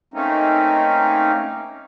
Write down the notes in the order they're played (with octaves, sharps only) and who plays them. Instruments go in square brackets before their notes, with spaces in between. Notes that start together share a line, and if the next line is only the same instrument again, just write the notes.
[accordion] A3 A#3 C4 C#4 D#4